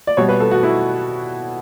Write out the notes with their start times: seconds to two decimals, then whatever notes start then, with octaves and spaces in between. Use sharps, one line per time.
0.07 D5
0.17 B2 G3 C#5
0.29 B4
0.40 A4
0.51 F#4
0.63 E4